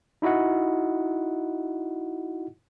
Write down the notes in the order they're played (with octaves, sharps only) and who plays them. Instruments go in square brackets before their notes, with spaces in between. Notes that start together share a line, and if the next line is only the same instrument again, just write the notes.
[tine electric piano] D#4 E4 F#4 D#5 F#5